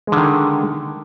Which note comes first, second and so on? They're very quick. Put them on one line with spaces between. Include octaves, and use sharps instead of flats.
G#3 D3 D#3